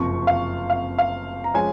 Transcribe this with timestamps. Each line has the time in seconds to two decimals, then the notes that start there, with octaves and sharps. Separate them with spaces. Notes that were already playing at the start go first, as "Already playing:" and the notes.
Already playing: F#1 F2 C3 F3 C#6
0.27 F5
0.70 F5
0.98 F5
1.44 A#5
1.54 F3 G#3 C#4 G#5